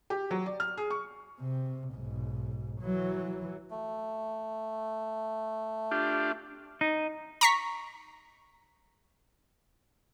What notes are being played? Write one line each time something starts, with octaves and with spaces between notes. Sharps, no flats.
G4
F#3
D5
F6
G#4
C#6
C3
B1 G#2
E3 F#3
A3
D4 F4 G4
D#4
A#5 C#6 B6